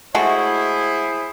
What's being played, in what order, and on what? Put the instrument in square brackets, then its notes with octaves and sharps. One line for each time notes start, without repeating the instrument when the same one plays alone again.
[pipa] G#3 A3 F#4 [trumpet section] E4 G#4 C5